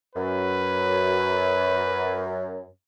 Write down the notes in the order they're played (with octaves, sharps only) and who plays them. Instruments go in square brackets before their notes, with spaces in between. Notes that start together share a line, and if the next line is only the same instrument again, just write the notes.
[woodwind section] F#2 [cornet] B4